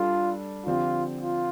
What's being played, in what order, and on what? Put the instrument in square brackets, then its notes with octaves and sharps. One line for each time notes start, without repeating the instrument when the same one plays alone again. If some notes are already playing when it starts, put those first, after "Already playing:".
Already playing: [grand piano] G3 D4 A4 [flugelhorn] F4
[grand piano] D3 F3 C4 G4 [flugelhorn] F4
[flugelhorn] F4